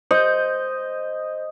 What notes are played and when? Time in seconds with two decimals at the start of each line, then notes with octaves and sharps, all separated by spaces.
0.11 C5 D#5 G6